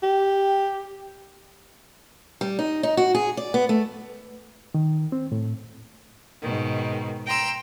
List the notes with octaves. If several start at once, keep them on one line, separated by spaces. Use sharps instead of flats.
G4
G3
D#4
D#4
F#4
G#4
D5
B3
A3
D#3
C4
A2
G#2 B2 D#3
G5 A#5 C6 E6